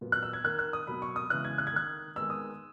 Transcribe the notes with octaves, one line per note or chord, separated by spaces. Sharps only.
A#2 F#3 B3
F#6
E6
G#6
D#3 A#3 F#6
F#6
D#6
B2 F#3 A#3 B5
C#6
D#6
C#3 E3 G#3 B3 F#6
G#6
F#6
G#6
D#3 A#3 F#6
D#3 G#3 B3 E6
D#6